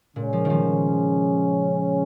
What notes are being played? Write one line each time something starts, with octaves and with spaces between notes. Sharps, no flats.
A#2 C#3 G#3 C#4
F3
D#3
F3